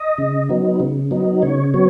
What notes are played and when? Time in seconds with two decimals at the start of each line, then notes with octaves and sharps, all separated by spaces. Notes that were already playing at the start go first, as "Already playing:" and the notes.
Already playing: D#5
0.18 C#3
0.49 F#3 B3 D#4
0.80 C#3
1.11 F#3 B3 D#4
1.42 C#3 C#5
1.74 F#3 B3 C#5